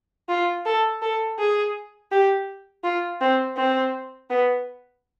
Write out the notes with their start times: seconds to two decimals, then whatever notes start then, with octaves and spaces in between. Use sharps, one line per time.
0.29 F4
0.66 A4
1.02 A4
1.39 G#4
2.12 G4
2.84 F4
3.21 C4
3.57 C4
4.30 B3